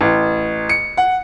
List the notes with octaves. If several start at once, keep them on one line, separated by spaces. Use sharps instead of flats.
A1
C#7
F#5